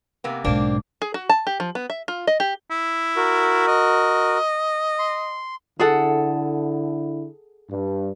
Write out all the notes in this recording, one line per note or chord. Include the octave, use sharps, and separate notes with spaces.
C3 A#3 B3
B1 G#2 A#3 C4 D4
G#4
F#4
A5
G4
F3
B3
E5
F4
D#5
G4
E4
F#4 A#4
D#5
C6
D3 E4 G#4 A4 F#5
G2